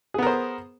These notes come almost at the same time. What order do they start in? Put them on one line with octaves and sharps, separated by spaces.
G#4 B3 A#4 C5